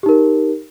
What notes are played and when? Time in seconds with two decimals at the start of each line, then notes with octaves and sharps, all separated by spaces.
0.03 G4
0.06 D#4
0.09 A#4